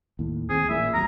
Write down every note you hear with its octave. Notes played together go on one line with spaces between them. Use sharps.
D#2 A2
D#2 C4 G#4
A1 F2 A#2 E5
G#1 D#2 F#3 A#5